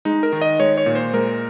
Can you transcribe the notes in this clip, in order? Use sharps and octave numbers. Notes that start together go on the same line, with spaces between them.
G#3 D#4
A#4
D#3
D#5
G#3 C#5
C#5
A#2
C5
G#3 A#4